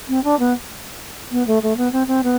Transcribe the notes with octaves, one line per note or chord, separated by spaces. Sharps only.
C4
D4
B3
B3
A3
A3
B3
C4
C4
B3